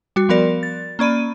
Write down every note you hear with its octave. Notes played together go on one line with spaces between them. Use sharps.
G3 F#4
F3 B3 F#4 A#4 D5
A6
A#3 C#4 D5 B5 D#7